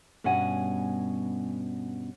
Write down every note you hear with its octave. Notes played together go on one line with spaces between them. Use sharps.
G2 B2 C#4 F#5 G#5